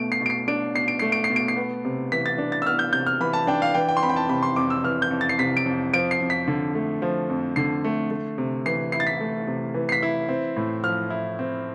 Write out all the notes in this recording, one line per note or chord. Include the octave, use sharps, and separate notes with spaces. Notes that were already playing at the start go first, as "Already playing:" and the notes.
Already playing: B2 A3 D7
C7
B2
D7
C7
D4 D7
B2 C7
D7
A3 C7
D7
C7
B2
D7
C7
B3
C3
E3 B6
A6
D4
A6
E6
B3 F6
G6
C3 G6
F6
E3 B5
A5
D4 G5
F5
E3 G5
G5
C6
F2 B5
G5
A5
C3 B5
C6
F2 D6
E6
E3 F6
G6
F2
A6
C7
C3 B6
D7
F2
F3 D7
C7
F2
B6
D3
A3
F3
F2
D3 C7
A3
A3
C3
E3 C7
E4 C7
A6
B6
A3
C3
E3
C7
B6
E4
C4
A2
F3 F6
E4
C4